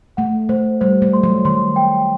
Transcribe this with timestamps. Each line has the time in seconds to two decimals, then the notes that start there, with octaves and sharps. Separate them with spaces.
0.17 A3 F#5
0.49 A3 C5
0.81 G3 C5
1.02 A3
1.13 C6
1.23 F#3
1.45 D#3 C6
1.76 G5